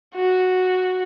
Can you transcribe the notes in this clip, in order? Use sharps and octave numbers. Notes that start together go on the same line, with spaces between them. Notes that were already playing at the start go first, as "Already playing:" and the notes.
F#4